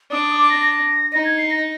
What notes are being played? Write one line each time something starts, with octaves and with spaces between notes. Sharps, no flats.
D4 D#6
D#6
D6
A#6
A#6
D#4 A#6
G#6
C7
A#6